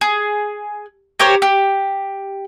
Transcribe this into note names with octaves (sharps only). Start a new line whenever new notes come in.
G#4
G4 A#4 C5 C#5
G4